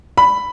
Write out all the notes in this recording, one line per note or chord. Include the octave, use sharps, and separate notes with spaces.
B5